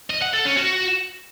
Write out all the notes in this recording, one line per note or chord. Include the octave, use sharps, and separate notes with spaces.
D#5
F#5
A4
C#4
F#4